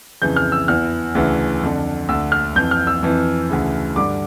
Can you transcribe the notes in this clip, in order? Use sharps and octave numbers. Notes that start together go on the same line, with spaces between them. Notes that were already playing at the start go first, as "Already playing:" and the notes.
F2 C#3 E3 G6
F6
E6
E2 E3 F6
D2 C#3 E3
F2 D3
D2 D3 E6
F6
F2 E3 G6
F6
E6
F2 E3
D2 C#3 E3
G2 D3 D6